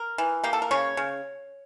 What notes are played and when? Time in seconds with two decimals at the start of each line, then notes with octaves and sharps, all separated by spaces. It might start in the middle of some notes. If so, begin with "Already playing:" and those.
Already playing: A#4
0.18 E3
0.44 A#3 G4
0.53 A4
0.62 A#4
0.71 C#3 C#5
0.97 C#3